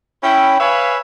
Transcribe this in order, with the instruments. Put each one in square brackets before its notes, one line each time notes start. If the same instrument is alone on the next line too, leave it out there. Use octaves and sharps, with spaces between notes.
[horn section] C#4 E4 G5
B4 C#5 E5 F5 G#5 B5